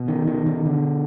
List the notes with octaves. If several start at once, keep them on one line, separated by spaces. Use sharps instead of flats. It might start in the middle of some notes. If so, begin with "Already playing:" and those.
Already playing: B2
D#3
D#3
D#3
D3